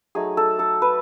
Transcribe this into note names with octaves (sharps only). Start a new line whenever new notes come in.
F#3 A3 D#4 G#4
A4
A4
B4